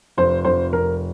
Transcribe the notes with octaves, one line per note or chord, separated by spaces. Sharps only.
F1 C5
F1 C5
F1 A#4